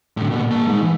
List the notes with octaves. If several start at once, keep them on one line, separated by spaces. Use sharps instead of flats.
A2 D3
A#2 B3
A#3 A5
G#3 D#4
E3